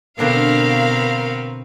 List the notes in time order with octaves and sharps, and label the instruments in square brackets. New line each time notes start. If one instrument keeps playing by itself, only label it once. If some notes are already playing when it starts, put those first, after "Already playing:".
[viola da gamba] B2 B3 C4 [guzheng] D3 D4 C6 [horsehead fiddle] A#4 [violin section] F5